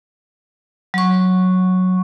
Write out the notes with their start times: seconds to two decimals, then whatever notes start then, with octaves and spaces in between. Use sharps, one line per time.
0.94 F#3 C#6